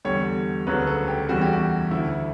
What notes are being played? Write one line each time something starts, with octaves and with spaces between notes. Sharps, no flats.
E2 D3 G3 C#5
D2 C#3 F#3 B4
A4
G4
E2 C#3 E3 G3 F#4
G4
F#4
D2 D3 A3 E4